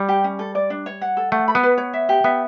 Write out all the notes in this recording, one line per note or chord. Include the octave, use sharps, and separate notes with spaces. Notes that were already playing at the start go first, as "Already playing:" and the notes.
Already playing: G3
G4
C#4
A4
D5
D4
C#5
F#5
A4
A3 F#5
B5
B3
B4
C#5
E5
G4
B3 E5